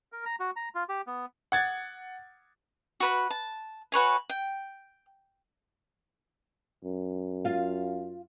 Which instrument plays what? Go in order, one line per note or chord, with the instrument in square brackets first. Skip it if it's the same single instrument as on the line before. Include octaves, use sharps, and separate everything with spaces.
[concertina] A#4
A#5
F#4
A#5
F4
G4
B3
[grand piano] F#5 G#6 A6
[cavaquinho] F#4 B4 B5
A5
F#4 B4 C#5 G#5
G5
[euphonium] F#2
[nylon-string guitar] F4 F5